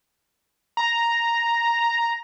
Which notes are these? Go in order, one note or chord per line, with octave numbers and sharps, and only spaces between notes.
A#5